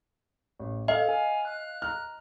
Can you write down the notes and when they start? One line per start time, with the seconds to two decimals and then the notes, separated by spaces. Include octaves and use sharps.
0.59 A1
0.88 A4 D#5 F5 F6
1.09 G#5
1.45 F#6
1.82 A#5 F6